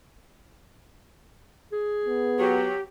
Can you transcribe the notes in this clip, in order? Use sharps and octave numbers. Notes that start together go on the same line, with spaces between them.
G#4
B3
F#3 G4